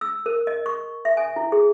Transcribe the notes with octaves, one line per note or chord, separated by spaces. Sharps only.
E6
A#4
D#5
C#6
E5
G#5
E4
G#4